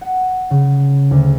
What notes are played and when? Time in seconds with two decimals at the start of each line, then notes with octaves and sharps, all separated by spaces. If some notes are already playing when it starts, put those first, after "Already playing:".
0.01 F#5
0.50 C#3
1.11 D2